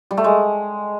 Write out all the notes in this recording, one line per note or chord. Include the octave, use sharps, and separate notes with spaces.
G3
A3
G#3